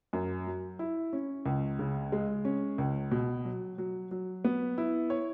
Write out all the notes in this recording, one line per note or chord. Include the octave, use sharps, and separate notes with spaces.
F#2
F#3
E4
C#4
C#2
C#3
G#3
C#4
C#2
B2
F#3
F#3
F#3
B3
E4
C#5